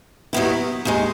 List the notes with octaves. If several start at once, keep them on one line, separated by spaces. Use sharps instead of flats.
D#2 D#3 F#3 B3 E4
D#2 D#3 G#3